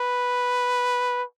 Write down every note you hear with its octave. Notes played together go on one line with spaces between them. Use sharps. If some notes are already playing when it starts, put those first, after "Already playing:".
Already playing: B4